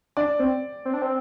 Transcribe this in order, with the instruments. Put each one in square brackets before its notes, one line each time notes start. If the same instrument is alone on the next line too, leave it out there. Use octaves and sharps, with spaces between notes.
[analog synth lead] D4 [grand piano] D5
[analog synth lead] C4
C4
D4
C4